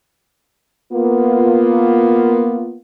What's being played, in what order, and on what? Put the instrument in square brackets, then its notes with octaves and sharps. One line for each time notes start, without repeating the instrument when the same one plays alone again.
[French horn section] A#3 B3 F4